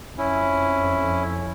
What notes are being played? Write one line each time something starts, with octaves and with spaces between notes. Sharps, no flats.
F2 C#4 E4